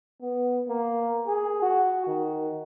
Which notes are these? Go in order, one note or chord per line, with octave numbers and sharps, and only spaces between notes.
B3
A#3
G#4
F#4
D#3